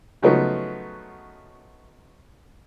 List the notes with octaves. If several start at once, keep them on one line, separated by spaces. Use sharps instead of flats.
C#3 F3 F#3 A3 B3 D#4